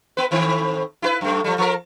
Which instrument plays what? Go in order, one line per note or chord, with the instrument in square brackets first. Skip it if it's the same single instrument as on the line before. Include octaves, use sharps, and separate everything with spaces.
[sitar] B3 B4
A2 D#3 C4
E4 F4 B4
F#2 A3
F3 G3
F3 A#4